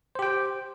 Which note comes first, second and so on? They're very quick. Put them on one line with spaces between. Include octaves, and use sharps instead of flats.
C5 G4 G5